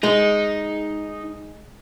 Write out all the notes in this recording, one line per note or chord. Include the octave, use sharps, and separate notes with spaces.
G#3 D#4